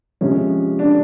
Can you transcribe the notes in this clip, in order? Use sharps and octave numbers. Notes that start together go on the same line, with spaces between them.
C3 F3 G#3 C#4
D4